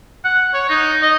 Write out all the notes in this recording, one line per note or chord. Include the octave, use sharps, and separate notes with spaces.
F#5
C#5
D#4
D#5